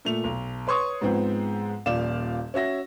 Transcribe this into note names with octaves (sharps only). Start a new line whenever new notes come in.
A#2 A3 F7
B1
B4 C#5 C6 C#6 D#6
G#2 F3 G#3 B3 C4
D#1 A#2 F3 D5 F5 E7
C#4 F#4 E5 A#6